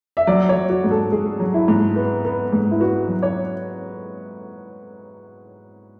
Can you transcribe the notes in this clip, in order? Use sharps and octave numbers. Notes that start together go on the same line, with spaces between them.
E5
F#3 D5
C#5
F#3
F#4
G#2
A4
G#2 G#4
F#3
E4
G#2
B3
B3
G#2
E4
B3 F#4
F#3
C#5